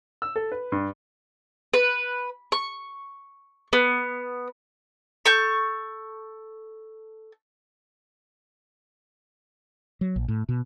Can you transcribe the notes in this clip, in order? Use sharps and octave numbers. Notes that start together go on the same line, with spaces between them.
E6
A4
B4
G2
B4
C#6
B3
A4 C#6 G6
F#3
A#1
A2
B2